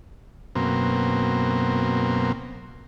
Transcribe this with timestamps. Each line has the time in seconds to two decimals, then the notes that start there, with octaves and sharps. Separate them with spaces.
0.55 F#2 B2 A#3 C4